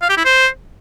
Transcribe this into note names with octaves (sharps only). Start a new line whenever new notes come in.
F5
G4
E4
C5